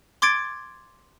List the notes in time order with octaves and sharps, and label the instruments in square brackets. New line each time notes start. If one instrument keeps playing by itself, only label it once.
[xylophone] C6 D6 G#6 A6 D7